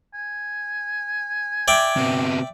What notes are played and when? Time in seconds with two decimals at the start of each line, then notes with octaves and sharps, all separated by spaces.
0.14 G#5
1.68 D5 E5 G5
1.96 C3 B3